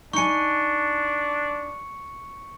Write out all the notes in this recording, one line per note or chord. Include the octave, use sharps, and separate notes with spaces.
D4 D#4 G#5 C#6 C#7